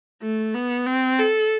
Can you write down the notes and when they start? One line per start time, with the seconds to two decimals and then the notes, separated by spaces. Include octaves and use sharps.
0.22 A3
0.54 B3
0.87 C4
1.19 A4